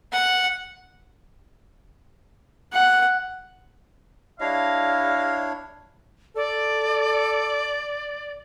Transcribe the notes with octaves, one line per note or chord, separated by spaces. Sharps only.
F#5
F#5
G3 D4 E4 C#5 D#5 F5
A4 D5